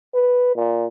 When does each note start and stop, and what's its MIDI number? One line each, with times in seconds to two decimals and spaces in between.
0.15 0.52 71
0.56 0.86 46